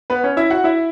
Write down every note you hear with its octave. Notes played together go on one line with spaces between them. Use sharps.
B3 B4
C#4 C#5
E4 E5
F#4 F#5
E4 E5